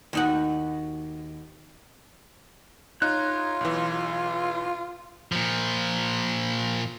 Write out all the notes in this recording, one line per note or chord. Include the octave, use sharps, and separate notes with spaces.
D#2 D#4 F#4
D#4 F4 C#5 F#6
B1 E3
A#2 F3